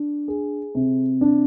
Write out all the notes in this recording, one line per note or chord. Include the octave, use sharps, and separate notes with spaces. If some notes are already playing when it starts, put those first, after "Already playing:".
Already playing: D4
G#4
C3
D4